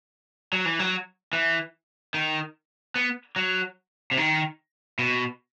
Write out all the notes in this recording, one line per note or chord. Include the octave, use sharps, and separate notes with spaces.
F#3
E3
F#3
E3
D#3
B3
F#3
C3
D#3
B2